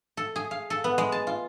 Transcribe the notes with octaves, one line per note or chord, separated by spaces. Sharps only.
A4
G#4
F5
A4
B3
G#3
A5
F4